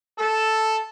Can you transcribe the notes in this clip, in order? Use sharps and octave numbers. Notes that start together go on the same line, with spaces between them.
A4